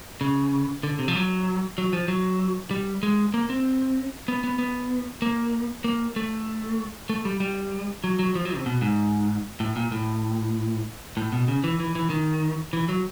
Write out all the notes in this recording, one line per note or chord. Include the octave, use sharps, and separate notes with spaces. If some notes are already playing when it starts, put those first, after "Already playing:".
C#3
D3
C3
F3
F#3
F#3
F3
F#3
G3
G#3
A#3
C4
B3
B3
B3
A#3
A#3
A3
A3
G3
G3
F#3
F#3
F3
F#3
C3
B2
G#2
A2
A#2
A2
A2
B2
C#3
E3
E3
E3
D#3
E3
F#3